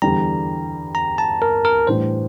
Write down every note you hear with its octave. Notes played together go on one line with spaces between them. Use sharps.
E2 D3 G3 A#5
A#5
A5
A#4
A#4
A2 E3 G3 D4 C5